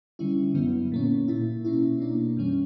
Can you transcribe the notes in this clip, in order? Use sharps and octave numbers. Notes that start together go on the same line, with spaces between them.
D3 G3 C#4 E4
F#2 D3 F#3 B3 E4
A#2 A#3 C#4
A#2 A#3 E4
B2 A#3 C#4 E4
B2 A#3 D4
F#2 E3 G3 C#4